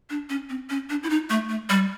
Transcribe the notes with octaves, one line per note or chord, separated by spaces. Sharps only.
D4
C#4
C4
C#4
D4
E4
D#4
A3
A3
G3